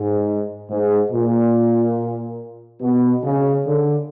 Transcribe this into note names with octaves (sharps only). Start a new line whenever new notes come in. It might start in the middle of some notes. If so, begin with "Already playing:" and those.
Already playing: G#2
G#2
A#2
B2
C#3
D3